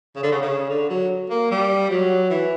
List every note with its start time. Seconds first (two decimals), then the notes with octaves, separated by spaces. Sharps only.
0.16 C#3
0.23 D3
0.32 C#3
0.42 C#3
0.70 D3
0.90 F#3
1.30 A#3
1.51 G3
1.90 F#3
2.30 E3